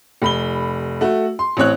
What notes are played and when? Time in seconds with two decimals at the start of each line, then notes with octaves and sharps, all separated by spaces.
0.22 F1 B5 G7
1.01 A3 F#4
1.39 C6
1.57 A1 C4 C#5 F#6